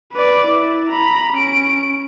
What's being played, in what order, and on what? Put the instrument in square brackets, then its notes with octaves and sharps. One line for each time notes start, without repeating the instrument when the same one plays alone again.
[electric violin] B4 D5
E4
A#5 B5
C#4 D7